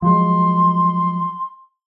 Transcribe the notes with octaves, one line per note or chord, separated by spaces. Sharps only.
F3 F#3 G#3 C6